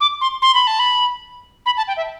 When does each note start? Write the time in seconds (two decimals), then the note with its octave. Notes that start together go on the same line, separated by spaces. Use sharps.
0.01 D6
0.21 C6
0.42 C6
0.55 B5
0.67 A5
0.79 B5
1.66 B5
1.77 A5
1.88 G5
1.97 E5